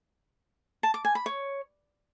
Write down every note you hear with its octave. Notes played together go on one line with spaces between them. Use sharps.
A5
D6
G#5
B5
C#5